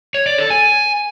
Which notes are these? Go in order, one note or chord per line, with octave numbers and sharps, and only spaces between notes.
C#5
D5
A4
G#5